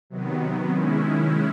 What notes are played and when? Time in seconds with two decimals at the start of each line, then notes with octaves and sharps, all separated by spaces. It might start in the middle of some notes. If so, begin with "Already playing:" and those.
0.10 C3 D#3 F#3 B3
0.72 D#3 G#3 C#4 E4